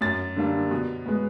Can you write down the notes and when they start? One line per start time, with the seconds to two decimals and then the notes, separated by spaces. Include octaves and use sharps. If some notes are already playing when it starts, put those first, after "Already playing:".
0.01 F#2 A6
0.36 D3 G3 A#3 D4
0.71 B2
1.06 G#3 B3